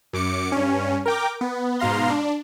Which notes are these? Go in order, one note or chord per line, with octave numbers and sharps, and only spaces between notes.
F#2 D6 C#7
G2 C#4
A#4 G5 D6
B3
G#2 B2 F5 A#5 C6
D4